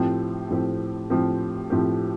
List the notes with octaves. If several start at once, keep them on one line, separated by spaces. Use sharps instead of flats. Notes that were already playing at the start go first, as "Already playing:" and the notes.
Already playing: A2 F3 C4 G4
A2 F3 C4 G4
A2 F3 C4 G4
A2 F3 C4 G4